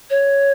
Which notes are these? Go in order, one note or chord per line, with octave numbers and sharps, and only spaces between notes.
C#5